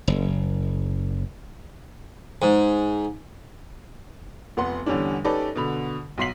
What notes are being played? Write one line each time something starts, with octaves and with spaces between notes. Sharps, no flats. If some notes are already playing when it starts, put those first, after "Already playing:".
F#1
G#2
F1 B3 F#5 C6
E2 D3 G3 C#4 D4
C#4 D#4 G4 A4 B4 D5
B2 D3 B5
B1 F#4 C6 B6 C7 F#7